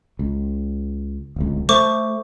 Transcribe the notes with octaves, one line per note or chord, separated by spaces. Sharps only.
C#2
D1 C#2
A3 C5 C#6 D6